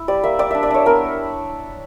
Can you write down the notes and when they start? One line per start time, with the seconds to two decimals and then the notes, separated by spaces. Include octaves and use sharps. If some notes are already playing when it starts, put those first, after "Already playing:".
Already playing: E4
0.08 G3 D5
0.23 A#3 E5
0.39 G3 D5
0.51 D4 E5
0.63 D5
0.70 D4 C#5
0.86 B3 A#4